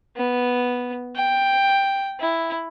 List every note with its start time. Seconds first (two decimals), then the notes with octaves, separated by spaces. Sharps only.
0.17 B3
1.16 G5
2.20 E4